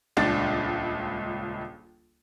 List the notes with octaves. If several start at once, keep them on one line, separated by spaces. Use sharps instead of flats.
D#1 C#2 D4 A6